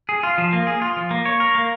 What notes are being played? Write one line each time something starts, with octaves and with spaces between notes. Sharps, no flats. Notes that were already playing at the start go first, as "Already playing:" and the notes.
G#4
F4
F3
A#3
G#4
F4
F3
A#3
C#5
A#4
A#3